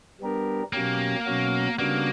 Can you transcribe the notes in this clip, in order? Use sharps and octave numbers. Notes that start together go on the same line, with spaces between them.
G3 B3 D4 G4 A#4
B2 F#3 A#3 C#4 G4
B2 F#3 C#4 F#4
C#3 G3 A#3 B3 D4 F#4